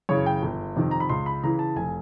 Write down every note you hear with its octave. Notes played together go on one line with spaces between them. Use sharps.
F#2 C#3 E3 C#5
G5
G1
F2 C3 D#3
A#5
B5
C#2 C6
B5
C#3 E3 A#5
A5
F1 G#5